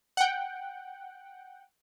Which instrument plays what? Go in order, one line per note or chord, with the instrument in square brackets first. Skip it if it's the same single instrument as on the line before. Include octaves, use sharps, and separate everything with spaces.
[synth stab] F#5 G5